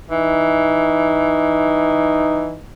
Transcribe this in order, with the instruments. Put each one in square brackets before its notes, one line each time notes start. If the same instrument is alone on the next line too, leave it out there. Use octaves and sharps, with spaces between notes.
[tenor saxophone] E3 [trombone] D#4